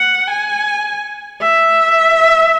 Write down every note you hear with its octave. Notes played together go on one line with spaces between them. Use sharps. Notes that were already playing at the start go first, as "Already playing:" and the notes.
Already playing: F#5
G#5
E5